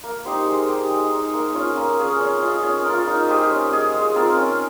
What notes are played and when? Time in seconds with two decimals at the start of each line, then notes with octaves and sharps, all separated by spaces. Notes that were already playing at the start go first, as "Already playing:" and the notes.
0.04 A#3
0.25 D#4 G4 C5
0.46 G#3
0.68 D#4 G4
0.91 G#3
1.12 D#4 G#4
1.34 A#3
1.55 C#4 F4
1.77 A#3
1.99 C#4 G#4
2.21 C#4
2.43 F4 G#4 D#5
2.63 C#4
2.86 F4 A#4
3.07 D#4
3.28 G4 C5 D#5
3.51 C#4
3.72 G#4 D#5
3.94 G#3
4.15 C4 F4 A#4
4.37 C#4